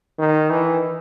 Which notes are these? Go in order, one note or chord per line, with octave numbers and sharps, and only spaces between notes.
D#3
E3